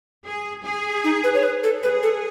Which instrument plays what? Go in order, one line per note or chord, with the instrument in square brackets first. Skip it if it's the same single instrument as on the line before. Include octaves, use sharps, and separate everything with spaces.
[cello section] G#4
G#4
[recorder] D#4
B4
C#5
B4
A4
[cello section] G#4 [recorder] B4
[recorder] A4